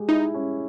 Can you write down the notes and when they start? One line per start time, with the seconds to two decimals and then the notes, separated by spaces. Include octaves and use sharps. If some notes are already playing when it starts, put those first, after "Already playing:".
Already playing: G#3 G4
0.08 D#4 E4
0.34 C#4